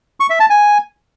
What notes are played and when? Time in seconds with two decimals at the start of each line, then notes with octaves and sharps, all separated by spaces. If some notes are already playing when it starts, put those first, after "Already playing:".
0.20 C#6
0.30 E5
0.40 A5
0.50 G#5